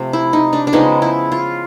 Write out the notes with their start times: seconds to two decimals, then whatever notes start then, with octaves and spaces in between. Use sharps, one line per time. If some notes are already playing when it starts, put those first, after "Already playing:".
Already playing: C3 F3 A3
0.13 E4
0.33 D#4
0.53 D4
0.67 D4
0.72 C#3 F3 G#3 B3 D#4
1.02 E4
1.32 F4